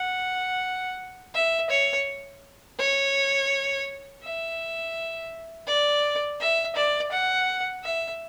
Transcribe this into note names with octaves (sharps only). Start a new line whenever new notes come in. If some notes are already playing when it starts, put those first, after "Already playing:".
Already playing: F#5
E5
C#5
C#5
E5
D5
E5
D5
F#5
E5